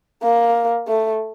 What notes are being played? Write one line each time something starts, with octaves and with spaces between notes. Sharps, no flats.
A#3
A3